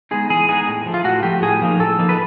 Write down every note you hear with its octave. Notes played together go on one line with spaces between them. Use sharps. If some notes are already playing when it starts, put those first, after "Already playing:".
G#3 B3 D#4 G#4
E3 G#4
G#3 B3 D#4 G#4
A2
F3 A3
F4
A2 F#4
F3 A3 G4
A2 G#4
F3 A#3 D#4
A2 A4
F3 A#3 D#4
B4